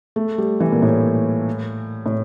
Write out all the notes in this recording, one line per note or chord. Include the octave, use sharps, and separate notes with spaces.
A3
G3
E3
A#2
A2
A2